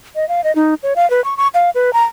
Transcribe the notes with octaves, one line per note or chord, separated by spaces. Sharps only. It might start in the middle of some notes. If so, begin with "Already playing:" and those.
D#5
F5
D#5
D#4
C#5
F5
B4
C#6
C#6
F5
B4
A#5